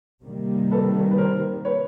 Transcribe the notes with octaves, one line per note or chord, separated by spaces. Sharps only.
C3 D#3 G3 A#3
A4 B4
B4
A#4 C5
B4 C#5